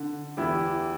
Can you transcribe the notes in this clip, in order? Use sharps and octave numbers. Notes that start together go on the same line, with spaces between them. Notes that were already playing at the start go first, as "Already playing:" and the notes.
Already playing: D3
E2 E4 G4